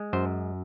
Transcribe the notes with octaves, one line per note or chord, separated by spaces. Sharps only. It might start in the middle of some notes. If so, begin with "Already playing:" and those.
Already playing: G#3
F#2 C5